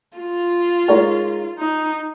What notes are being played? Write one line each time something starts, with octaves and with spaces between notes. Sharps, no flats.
F4
G#3 D#4 A#4 C#5
D#4